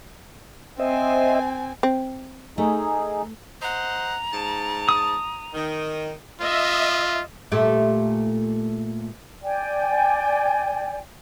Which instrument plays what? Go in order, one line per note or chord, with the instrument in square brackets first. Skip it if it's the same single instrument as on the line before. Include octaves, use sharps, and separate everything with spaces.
[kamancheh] C4 G#5 [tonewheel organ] C5 D#5 E5
[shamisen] C4
[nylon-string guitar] A3 [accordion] D#4 G#4
[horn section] C5 D#5 F#5 [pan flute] A#5
[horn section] G#2 A5
[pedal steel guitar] D#6
[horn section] D#3
[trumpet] F4 [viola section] D#5 E5
[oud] A#2 A3 G4
[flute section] D5 G5 G#5